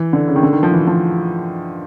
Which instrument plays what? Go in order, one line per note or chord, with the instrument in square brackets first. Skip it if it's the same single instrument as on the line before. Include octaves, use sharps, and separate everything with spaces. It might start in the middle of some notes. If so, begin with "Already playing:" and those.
Already playing: [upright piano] E3
D3
C#3
D#3
D3
D#3
F3
E3
F3